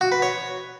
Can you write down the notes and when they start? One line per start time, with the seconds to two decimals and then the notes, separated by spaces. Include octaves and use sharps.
0.01 F#4
0.12 B4
0.22 C#5